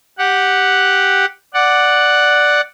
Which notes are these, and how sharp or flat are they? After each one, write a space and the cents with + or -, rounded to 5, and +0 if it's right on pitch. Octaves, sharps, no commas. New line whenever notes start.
G4 +0 F#5 +0
D5 +0 F#5 +0